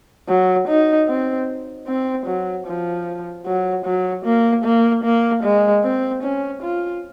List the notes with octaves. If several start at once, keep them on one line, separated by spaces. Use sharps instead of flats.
F#3
D#4
C4
C4
F#3
F3
F#3
F#3
A#3
A#3
A#3
G#3
C4
C#4
F4